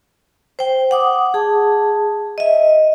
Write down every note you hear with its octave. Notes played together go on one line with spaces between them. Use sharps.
C5 G5
F#5 D6 D#6
G#4 A5
D#5 E5